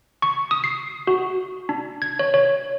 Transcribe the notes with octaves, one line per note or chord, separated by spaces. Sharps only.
C#6
D#6
C7
F#4
D4
G#6
C#5
C#5